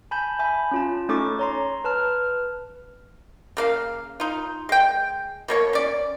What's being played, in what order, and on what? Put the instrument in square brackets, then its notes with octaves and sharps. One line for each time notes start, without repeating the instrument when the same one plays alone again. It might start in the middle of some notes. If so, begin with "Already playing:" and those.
[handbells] G#5 A5 B5 G6
E5 G#5 B5
C#4 F4 A5
A3 C#4 D#4 A4 C#6 D6
C#5 A#5 C6
B4 A5 F6
[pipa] C#3 A#3 F5
D#4 F4
G#3 G5
B2 A#3 C#5
C#4 D5